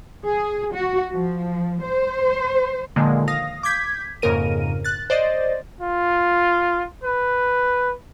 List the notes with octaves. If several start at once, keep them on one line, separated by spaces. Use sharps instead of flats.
G#4
F#4
F3
C5
A#2 D3 D#3 F3 G#3 A#3
F5 D#6 A#6
D6 G6 G#6 B6
F2 G#2 C#3 A#3 A#4 D#7
F#6 A6
C5 D5 D#5 A6
F4
B4